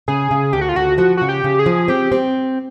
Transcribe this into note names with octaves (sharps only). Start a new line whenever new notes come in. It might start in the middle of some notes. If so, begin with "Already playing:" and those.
C#3 G#4
C#3
D2 G4
F#4
F4
D2 F#4
F3 F#4
C#3 F#4
G4
C#3
G#4
F3
C4 G4
C4